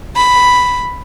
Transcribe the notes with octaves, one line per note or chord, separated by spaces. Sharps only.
B5